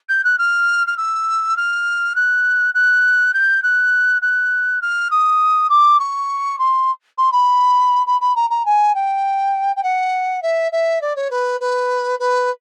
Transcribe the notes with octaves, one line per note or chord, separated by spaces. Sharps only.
G6
F#6
F6
F6
E6
F6
F#6
F#6
G6
F#6
F#6
F6
D#6
D6
C#6
C6
C6
B5
B5
B5
A#5
A#5
G#5
G5
G5
F#5
E5
E5
D5
C#5
B4
B4
B4